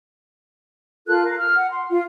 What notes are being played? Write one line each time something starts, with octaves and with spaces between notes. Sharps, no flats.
F4 A4 A#4 F#6
A#4 F5
F6
F#5
C6
F4